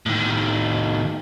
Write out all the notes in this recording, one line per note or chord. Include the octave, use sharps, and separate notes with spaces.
A2 D#3